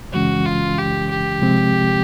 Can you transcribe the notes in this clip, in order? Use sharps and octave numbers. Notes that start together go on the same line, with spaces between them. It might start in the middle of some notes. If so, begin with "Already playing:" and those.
F#2 C#3 E3 G#3 C#4 F#4
F4
G4
G4
C3 F3 G#3 C4